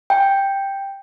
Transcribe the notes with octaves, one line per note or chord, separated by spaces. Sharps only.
G5